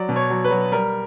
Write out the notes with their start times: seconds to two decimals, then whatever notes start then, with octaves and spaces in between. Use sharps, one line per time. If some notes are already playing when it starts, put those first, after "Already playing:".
Already playing: F#3 D5
0.09 B2
0.16 C#5
0.30 F#3
0.44 B4
0.51 F#3
0.72 G3 A#4